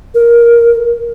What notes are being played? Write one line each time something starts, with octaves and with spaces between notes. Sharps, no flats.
A#4